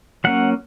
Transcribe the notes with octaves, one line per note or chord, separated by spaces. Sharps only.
F#3 A#3 C#4 F#5